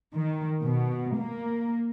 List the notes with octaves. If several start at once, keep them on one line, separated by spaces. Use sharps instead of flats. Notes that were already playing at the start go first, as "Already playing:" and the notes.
D#3
B2
A#3